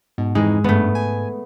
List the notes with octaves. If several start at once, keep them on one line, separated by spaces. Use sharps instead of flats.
G#2 B2
F2 E3 G#3 D#4
G2 A3 B3
G#5